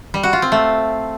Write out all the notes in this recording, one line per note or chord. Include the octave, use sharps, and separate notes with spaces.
G3
F#4
F4
C4
A3